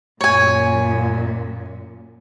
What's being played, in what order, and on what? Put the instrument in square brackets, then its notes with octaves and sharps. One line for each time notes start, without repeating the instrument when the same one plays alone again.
[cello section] F#2 A#2 [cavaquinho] C#5 G#5